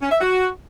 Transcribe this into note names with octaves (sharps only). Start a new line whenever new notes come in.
C#4
E5
F#4